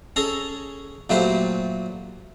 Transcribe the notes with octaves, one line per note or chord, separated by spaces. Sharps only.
C#4 G#4 A4 A#5
A#2 F#3 A3 G4 B4 C5